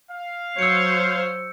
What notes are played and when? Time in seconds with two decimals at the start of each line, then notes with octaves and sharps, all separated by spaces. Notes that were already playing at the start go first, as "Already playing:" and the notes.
0.11 F5
0.59 F#3 C5 C#5 E6 G6 C#7